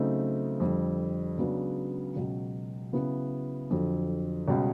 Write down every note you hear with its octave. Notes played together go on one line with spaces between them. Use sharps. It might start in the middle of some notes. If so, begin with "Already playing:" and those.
Already playing: C#3 F#3 A3 C4 D#4
F2 D3 G3
C#2 C#3 F#3 B3 D4
C#2 B2 F#3
C#3 F#3 B3 E4
F2 D3 F#3
C#2 B2 G3